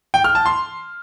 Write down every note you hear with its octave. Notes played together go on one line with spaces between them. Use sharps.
G5
F6
A5
C6